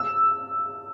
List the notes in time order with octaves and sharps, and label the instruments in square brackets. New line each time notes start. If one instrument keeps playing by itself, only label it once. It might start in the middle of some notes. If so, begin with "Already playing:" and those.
Already playing: [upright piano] E6